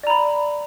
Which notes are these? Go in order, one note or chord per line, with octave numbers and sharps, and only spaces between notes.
D5 A#5 B5